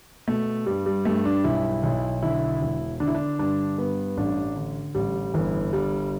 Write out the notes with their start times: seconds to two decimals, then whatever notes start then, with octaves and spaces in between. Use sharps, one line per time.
0.27 B2 A3
0.66 G2 G3
0.86 G3
1.05 G2 A3
1.25 D4
1.44 B1 E4
1.83 B1
2.23 D3 E4
2.61 E1
3.00 D3 D4
3.07 E4
3.15 D4
3.39 G2 D4
3.78 G2 B3
4.17 A1 D4
4.56 D3
4.95 A1 G3
5.34 G1 E3
5.73 G1 G3